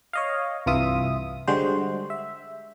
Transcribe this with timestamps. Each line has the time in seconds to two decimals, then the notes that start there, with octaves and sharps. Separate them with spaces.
0.13 C#5 D#5 F5
0.66 C2 G2 E3 F4 E5 D#6
1.47 D3 G3 G#3 F#4 C5
2.10 E5